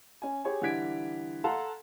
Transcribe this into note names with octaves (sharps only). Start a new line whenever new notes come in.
C#4 G#5
G4 G#4 C#5 G#5
D3 E3 G3 G#6 B6 D7
A4 F5 F#5 A5 A#5 C6